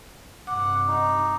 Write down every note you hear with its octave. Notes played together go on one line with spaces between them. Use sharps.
G2 C3 F#5 D6
D#4